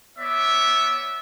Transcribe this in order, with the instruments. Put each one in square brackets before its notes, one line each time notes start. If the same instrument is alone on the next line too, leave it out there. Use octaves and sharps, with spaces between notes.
[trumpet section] B3 C#5 D5 E5